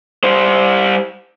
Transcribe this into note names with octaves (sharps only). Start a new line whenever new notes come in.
G3 C5